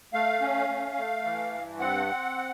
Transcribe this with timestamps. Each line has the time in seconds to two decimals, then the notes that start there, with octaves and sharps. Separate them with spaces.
0.13 A3 F5
0.41 C#4
0.69 A3
0.97 A3
1.25 E3
1.51 G2
1.80 C4 F#5
2.06 C4